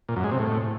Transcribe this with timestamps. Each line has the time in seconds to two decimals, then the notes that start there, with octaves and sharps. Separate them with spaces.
0.09 A#2
0.16 F#2
0.24 G#3
0.31 C3
0.39 A2